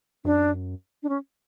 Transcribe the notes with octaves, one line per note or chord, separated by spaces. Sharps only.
F#2 D4
D4
C#4